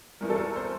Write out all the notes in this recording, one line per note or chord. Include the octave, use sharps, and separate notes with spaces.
E2 E3 G3 A#4
A4
A#4
C5